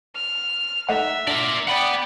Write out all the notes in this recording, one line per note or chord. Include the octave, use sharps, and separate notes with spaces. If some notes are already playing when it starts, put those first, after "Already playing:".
F6
A3 D#4 E5 F#5
D4 A#4 D5
D5 F#5 G5 B5